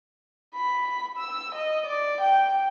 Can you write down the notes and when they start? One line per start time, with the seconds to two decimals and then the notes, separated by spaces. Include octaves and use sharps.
0.55 B5
1.18 E6
1.55 D#5
1.87 D5
2.21 G5